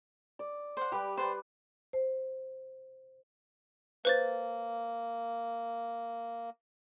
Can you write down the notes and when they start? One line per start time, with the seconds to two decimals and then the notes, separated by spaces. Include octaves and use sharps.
0.39 D5
0.77 C5 F#5
0.92 G3 G4 B4
1.17 B4 C5 D5 G5
1.93 C5
4.05 A#3 B4 C5 A6